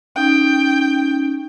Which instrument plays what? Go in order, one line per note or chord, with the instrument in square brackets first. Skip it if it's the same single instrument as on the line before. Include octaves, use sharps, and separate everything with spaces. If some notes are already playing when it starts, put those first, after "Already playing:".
[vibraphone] C#4 D#4 [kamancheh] G5